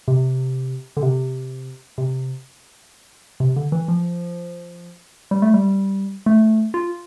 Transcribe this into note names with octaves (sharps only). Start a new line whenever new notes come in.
C3
D3
C3
C3
C3
D3
E3
F3
G3
A3
G3
A3
F4